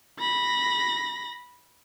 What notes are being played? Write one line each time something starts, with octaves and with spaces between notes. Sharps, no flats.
B5 A#6